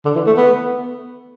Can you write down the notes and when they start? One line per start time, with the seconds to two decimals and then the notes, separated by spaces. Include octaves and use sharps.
0.05 D3
0.16 E3
0.27 A3
0.37 B3